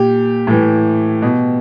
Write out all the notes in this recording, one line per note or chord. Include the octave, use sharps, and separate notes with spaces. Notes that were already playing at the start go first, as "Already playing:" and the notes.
Already playing: A#2 G4
A2 E3
B2